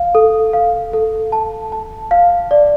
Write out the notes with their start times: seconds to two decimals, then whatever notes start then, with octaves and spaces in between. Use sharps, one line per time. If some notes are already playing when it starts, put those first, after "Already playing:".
Already playing: F5
0.15 A4
0.53 F5
0.93 A4
1.32 A5
1.72 A5
2.11 F5
2.51 D5